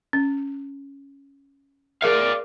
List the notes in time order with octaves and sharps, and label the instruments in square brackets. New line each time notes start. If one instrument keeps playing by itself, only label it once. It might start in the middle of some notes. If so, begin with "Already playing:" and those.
[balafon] C#4
[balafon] G#4 A#4 E5 [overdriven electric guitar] D5 F5